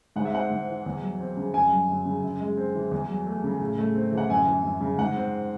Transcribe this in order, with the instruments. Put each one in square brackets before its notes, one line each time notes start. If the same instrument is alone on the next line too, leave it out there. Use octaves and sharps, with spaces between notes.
[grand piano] G#2 F#5
E5
C4 F#5
G#2
E3
E2
F#3
C4
C#3
F#2 G#5
F#3
F#2
C#3
F#2
G#3
C4
E3
E2
F#3
A3
C#3
A2
A3
C4
E3
F#5
F#2 G#5
E3
F#2
C#3
G#2 F#5
C4